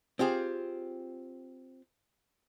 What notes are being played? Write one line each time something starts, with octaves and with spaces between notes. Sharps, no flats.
C4 F4 G4 G#4